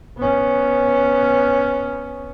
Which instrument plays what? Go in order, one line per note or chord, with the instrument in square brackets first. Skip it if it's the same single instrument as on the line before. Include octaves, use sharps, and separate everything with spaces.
[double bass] B3 C#4